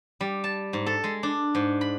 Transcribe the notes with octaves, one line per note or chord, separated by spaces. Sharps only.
G3
A5
G#2
A4
G#3
D4
G#2
B5